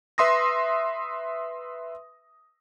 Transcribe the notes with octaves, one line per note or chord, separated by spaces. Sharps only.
B4 E5 C6 D#6 A#6